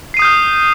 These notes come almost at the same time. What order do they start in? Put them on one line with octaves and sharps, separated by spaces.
C7 D#7 D#6 G6 F6